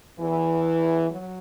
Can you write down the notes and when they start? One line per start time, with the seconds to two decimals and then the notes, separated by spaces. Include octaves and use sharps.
0.20 E2 E3
1.10 F#3